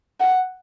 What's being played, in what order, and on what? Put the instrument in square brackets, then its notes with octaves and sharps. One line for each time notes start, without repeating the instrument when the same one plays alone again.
[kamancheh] F#5